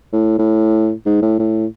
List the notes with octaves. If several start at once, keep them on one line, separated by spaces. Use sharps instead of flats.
A2
A2
G#2
A2
A2